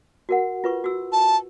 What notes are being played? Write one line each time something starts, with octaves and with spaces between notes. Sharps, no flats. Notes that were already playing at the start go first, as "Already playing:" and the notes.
F#4 A#4 F#5
F4 B4 C#6
F#4 E6
A5